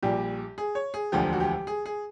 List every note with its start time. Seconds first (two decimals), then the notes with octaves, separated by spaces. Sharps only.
0.03 A#1 A#2 G3 G4
0.58 G#4
0.75 C#5
0.94 G#4
1.12 E1 D2 D3 F3 G4
1.33 F#4
1.40 G4
1.67 G#4
1.86 G#4